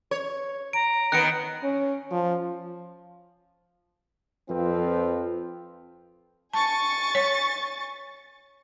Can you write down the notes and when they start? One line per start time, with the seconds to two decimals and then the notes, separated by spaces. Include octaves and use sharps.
0.11 C#5
0.73 A#5 D7
1.12 D#3 B3 F#6 C#7 D7
1.63 C#4
2.11 F3
4.50 F2 F3 C4 F4 B4
6.53 G#5 A5 C#6 A6
7.15 C#5